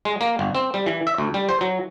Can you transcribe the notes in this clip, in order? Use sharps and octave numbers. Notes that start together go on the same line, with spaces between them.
G#3
A#3
G1
C4
G3
E3
E5
D2
G3
C5
F#3